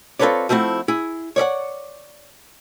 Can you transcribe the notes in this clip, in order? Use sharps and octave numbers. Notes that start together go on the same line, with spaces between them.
C4 F4 A4 B4 C#5 D5
F3 A3 C4 E4 F#4
E4 G#4
C#5 D5 E5 F#5